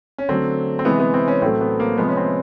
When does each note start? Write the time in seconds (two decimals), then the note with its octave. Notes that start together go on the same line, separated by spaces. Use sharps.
0.18 C#4
0.29 D3 F#3 A3 C4
0.79 C4
0.85 C3 E3 G#3 B3
0.99 B3
1.14 C4
1.28 C#4
1.42 A2 F#3 A3 C4
1.61 B3
1.80 A#3
1.98 C3 F3 G#3 B3
2.08 C#4
2.17 C4